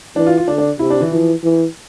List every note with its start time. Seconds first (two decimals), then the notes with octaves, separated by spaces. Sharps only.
0.16 E3 D4
0.27 F4
0.37 F4
0.48 D3 D4
0.58 D4
0.79 C3 E4
0.90 D4
1.01 E3
1.11 E3 F3
1.44 E3